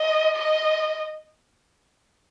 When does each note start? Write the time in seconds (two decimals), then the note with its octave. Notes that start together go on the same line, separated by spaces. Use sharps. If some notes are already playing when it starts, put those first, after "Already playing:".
Already playing: D#5
0.35 D#5